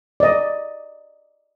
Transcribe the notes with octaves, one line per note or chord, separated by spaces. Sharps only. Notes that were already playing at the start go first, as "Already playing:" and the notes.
D5 D#5